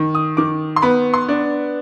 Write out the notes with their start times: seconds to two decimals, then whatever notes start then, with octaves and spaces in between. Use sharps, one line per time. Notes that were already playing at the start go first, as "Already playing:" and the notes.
Already playing: D#3
0.15 D#6
0.37 D#3 D6
0.76 C6
0.82 B3 B5
1.14 C6
1.29 D4